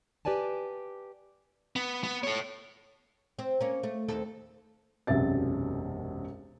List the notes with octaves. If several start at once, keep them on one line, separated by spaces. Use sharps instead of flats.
G4 B4 D5 G#5 A5
B3
B3
A4 C#5
C4
A#3 C#4
A3
D#2 C4 A4
E1 B1 F#2 C3 E5 A6